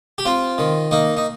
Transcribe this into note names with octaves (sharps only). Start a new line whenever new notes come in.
G4
C4 F4
D#3
A#3 D#4
D#4